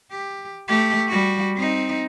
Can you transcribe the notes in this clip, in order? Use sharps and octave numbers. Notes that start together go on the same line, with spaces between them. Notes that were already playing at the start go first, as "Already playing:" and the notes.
G4
A3 G4
G3 F#4
C4 D#4